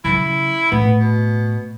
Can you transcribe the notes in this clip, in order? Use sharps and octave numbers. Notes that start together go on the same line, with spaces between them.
C#3 F#3 E4
A2 B3
B2